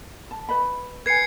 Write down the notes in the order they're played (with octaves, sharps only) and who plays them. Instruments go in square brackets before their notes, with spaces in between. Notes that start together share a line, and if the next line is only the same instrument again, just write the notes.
[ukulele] A5
B4 D#5 B5
[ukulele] B4 G#5 [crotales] G#6 C7 C#7